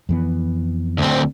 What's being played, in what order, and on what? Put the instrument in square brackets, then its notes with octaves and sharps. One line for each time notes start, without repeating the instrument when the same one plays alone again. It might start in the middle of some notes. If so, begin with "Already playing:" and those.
[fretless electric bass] F2 E3 B3
[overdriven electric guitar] D2 C4